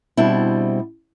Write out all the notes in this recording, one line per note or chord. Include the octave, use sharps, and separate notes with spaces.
B2 G3 C4 D4 E4